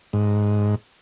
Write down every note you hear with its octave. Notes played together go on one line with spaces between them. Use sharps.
G#2